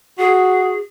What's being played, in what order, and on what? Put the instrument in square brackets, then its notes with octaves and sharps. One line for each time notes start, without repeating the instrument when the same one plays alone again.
[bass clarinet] F#4 [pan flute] G#4